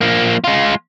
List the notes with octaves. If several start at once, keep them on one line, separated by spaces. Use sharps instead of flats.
F3 A#3
G#3 F4